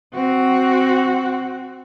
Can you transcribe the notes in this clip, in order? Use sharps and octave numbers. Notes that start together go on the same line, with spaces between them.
C4 F#4